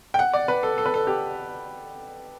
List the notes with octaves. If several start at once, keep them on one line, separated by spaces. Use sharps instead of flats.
G5
F#5
D5
B4
A4
A4
B4
A4
G4